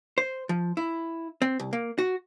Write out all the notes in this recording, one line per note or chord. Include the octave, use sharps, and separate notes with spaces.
C5
F3
E4
C4
C2
A#3
F#4